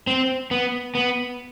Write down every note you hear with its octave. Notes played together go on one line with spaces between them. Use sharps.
C4
B3
B3